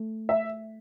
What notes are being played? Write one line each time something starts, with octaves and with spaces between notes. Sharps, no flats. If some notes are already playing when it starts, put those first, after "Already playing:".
Already playing: A3
E5